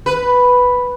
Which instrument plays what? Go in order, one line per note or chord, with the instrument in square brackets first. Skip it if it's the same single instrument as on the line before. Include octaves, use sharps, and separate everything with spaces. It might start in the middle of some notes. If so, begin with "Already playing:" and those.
[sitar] B4